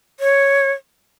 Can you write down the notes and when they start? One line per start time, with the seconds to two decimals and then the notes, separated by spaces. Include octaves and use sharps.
0.20 C#5